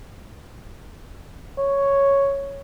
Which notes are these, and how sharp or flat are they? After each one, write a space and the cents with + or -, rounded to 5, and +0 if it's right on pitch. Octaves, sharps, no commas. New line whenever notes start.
C#5 +0